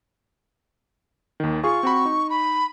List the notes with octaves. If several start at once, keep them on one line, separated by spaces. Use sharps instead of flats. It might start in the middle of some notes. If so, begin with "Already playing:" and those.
D#2 D#3
F4 G#4 C#6
C4 F#4 B5
D#4
B5